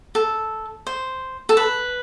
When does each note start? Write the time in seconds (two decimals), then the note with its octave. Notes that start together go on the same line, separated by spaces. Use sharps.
0.15 A4
0.87 C5
1.49 A4
1.57 B4